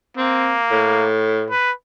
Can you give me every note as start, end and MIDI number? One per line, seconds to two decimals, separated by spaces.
0.17 1.07 58
0.17 0.55 60
0.71 1.50 45
1.50 1.72 71